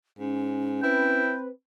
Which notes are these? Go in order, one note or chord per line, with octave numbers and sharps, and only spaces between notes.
G#2 C#4
C4 E4 B4 G5